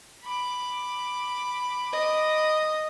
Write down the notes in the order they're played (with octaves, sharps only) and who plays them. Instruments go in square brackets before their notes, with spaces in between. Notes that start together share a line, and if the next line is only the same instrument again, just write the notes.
[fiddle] B5 D6
[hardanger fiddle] D#5